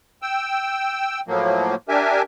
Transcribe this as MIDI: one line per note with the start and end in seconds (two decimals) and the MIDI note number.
0.22 1.20 79
0.22 1.20 88
1.28 1.75 45
1.28 1.75 53
1.28 1.75 54
1.28 1.75 58
1.89 2.22 62
1.89 2.22 67
1.89 2.22 70
1.89 2.22 76
1.89 2.22 80